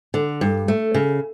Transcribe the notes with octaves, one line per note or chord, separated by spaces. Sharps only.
D3
G2
A3
C#3